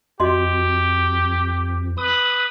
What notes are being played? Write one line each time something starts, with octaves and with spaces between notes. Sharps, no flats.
F2 F#4 G4 D#5 C6
B4 D#6